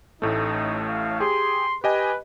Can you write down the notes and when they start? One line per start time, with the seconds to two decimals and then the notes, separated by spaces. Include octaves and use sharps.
0.22 A1 A2 A3 D#4
0.88 F5
1.20 G4 G#4 C6
1.84 G4 B4 D#5 G#5